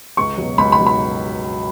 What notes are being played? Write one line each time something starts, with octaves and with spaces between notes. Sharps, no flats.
C#2 C#6
B2 F#3
C#2 B5
B5
B2 F#3
B5